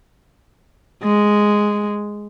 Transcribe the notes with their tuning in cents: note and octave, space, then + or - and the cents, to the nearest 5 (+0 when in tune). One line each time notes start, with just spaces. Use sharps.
G#3 +0